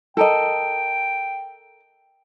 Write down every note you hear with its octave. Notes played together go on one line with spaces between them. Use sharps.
A4 A#4 D#5 G5